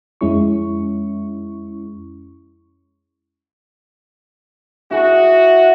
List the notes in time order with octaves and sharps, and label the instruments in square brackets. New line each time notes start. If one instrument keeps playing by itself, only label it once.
[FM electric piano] F2 G#3 C#4 E4 C#6
[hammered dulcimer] E4 G#4 [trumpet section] F#4